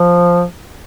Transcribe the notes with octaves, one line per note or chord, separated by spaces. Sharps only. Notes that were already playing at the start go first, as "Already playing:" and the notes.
Already playing: F3